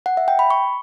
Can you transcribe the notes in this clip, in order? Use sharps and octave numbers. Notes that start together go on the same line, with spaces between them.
F#5
E5
G5
B5
C#6